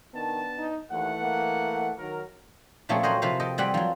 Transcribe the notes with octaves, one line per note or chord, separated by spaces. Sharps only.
D#3 B3 D4 A5
D#4
D#2 E3 A3 F#5
A#3
D#3 F#3 A#4
A#2 F3 A3 C4 C#4 G#4
F#3 A#4 C5 C#5 D#5 F#5
C3 F3 E4 B4 C5 F5
A4 D#5 G5
G3 C4 G#4 B4 D5 F#5
F3 F#3